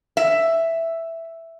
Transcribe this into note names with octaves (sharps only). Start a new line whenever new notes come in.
E5